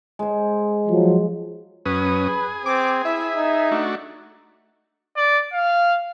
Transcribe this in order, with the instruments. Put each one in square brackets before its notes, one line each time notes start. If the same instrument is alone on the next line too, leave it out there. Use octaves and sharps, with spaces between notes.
[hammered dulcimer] G#3 C5
[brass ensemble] F3 F#3
[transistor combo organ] F#2 C#4 D#6 [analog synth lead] B4
[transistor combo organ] G#4
[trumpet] C4 [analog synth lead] D6
[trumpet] E4 [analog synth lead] E5
[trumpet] D#4
[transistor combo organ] A3 D4 F#4
[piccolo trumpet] D5
F5